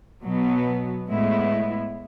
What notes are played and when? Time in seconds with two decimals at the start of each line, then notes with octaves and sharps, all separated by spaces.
0.24 B2 F#3 B3
1.08 A2 G#3 B3 E4